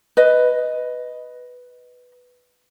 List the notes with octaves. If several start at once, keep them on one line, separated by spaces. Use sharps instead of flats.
B4 D#5